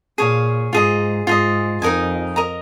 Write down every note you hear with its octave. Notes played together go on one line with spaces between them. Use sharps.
A#2 G#4 C#5 F5
G#2 F4 G#4 D#5
G#2 F4 G#4 D#5
F2 D#4 A#4 D#5 G#5
A#4 D#5 A#5